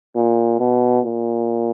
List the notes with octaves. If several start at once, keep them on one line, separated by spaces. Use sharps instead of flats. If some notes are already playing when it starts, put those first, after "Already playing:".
A#2
B2
A#2